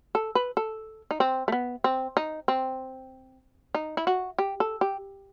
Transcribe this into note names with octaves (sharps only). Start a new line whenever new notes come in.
A4
B4
A4
D#4
C4
A3
B3
C4
D#4
C4
D#4
E4
F#4
G4
A4
G4